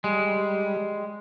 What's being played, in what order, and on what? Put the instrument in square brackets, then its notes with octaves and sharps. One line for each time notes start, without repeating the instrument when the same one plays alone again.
[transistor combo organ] G3 [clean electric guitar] G#3